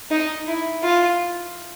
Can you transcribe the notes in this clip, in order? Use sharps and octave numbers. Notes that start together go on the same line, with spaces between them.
D#4
E4
F4